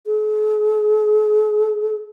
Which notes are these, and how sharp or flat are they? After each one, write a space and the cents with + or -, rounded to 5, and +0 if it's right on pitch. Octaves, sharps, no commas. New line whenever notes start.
G#4 +45